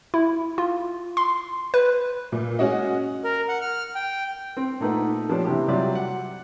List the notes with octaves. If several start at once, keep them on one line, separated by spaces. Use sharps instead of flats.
E4
F4
C6
B4
A#2
G#3 C#4 F#4 D#5
A#4
F#5
F6
G5
C4
A#2 A3 D#4 B4 F#5
F3 B3 C#4 D4 G4
C3 E3 G4
C3 F#3 G3 F4 D5
F#5